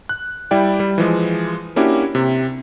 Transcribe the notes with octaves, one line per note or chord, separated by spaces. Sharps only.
F#6
G3 E4 D5 G5
G3
E3 F3 G#3
A#3 C#4 D4 E4 F#4 G4
C3